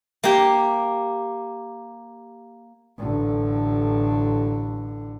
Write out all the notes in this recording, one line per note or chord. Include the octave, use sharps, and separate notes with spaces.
A#3 G4
A1 D3